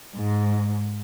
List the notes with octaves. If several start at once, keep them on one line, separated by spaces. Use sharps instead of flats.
G#2